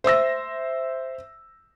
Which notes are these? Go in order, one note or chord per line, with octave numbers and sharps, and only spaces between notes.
C5 E5 E6 A#6